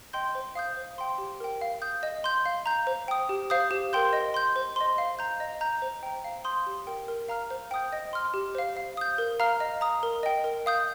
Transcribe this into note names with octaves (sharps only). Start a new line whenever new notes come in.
D#5 G5 C6 G6
C5
F5 D#6 G6
C5
G5 C6
G4
A#4 G5
F5
D#6 G6
D#5
C6 G6
F5
A#5 G6
C5
G5 D#6
G4
C5 F5 D#6 G6
G4
A#4 G5 C6 G6
D#5
C6 G6
C5
D#5 C6
F5
A#5 G6
D#5
A#5 G6
C5
G5 A#5
F5
C6 D#6 G6
G4
A#4 G5
A#4
F5 A#5 F6
C5
G5 D#6 G6
D#5
C6 F6
G4
C5 F5
F5
D#6 G6
A#4
F5 A#5 F6
D#5
A#5 D#6
A#4
D#5 G5
A#4
F5 D#6 G6